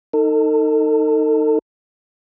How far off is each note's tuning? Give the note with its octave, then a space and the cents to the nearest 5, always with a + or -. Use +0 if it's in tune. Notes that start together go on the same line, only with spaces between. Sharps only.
D#4 +0 A4 +35